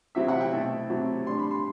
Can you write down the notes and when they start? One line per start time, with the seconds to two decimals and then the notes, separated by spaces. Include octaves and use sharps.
0.15 C3 F#3 C4 E4 E5
0.28 F#5
0.41 G5
0.52 B2 A3 C4 E4
0.90 C3 F#3 A3 C4 E4
1.27 A2 G3 D4 C6
1.39 B5
1.51 C6